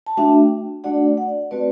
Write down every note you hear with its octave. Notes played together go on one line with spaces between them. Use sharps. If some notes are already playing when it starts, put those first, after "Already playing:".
A5
A3 D4 F#4 E5 G5
A3 D4 F#4 D5 F#5
D5 F#5
A3 C4 F#4 B4 D5